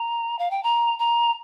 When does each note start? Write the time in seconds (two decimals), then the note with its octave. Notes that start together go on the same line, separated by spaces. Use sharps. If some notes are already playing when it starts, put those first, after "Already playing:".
Already playing: A#5
0.39 F5
0.51 G5
0.63 A#5
0.99 A#5